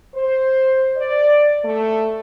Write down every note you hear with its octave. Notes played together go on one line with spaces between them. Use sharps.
C5
D5
A3